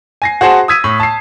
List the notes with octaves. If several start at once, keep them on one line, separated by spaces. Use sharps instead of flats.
G#5 A#6 C7
F#4 G#4 C5 F#5 A5
D#6 E6 G#6 B6 D#7
A2
A5 C7